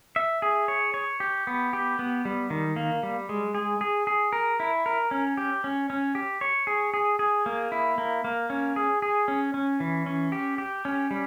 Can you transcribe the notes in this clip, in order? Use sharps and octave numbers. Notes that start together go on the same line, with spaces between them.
E5
G#4
C#5
C#5
G4
B3
G4
B3
G3
D#3
A#3
G3
G#3
G#4
G#4
G#4
A#4
E4
A#4
C#4
G4
C#4
C#4
G4
C#5
G#4
G#4
G#4
A#3
E4
A#3
A#3
C#4
G#4
G#4
C#4
C#4
E3
C#4
G4
G4
C#4
G3